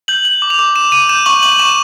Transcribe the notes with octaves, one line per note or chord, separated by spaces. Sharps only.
G6 F#7
G6 F#7
D6
F7
D6
D6 E7
D6 D#7
G6 E7
C#6 F#7
C#6 F#7
C#6 E7